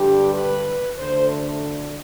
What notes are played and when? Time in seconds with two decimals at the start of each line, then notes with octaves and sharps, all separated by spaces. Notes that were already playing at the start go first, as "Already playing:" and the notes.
Already playing: G2 D3 G3 G4
0.34 B4
0.98 D2 D3 A3 C5